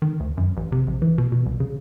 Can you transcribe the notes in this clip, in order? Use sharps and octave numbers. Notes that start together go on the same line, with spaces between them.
D#3
D2
F#2
A1
C3
A#1
E3
B2
B2
C2
C#3